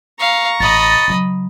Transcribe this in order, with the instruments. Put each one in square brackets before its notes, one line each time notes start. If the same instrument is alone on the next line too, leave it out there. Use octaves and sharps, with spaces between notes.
[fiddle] F5 [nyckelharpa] A#5 C#6
[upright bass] A1 [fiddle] D#5 B5 [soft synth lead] A6
[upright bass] C#3 F#3